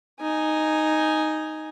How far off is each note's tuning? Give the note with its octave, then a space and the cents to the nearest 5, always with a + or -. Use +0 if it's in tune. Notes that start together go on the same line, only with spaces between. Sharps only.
D#4 +0 G#5 +0